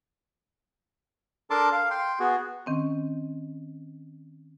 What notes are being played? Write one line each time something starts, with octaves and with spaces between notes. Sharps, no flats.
D4 A4 A#4 A5 C6 D6
F5
G5 C6
B3 F#4 G#4
D#3 C4 C#4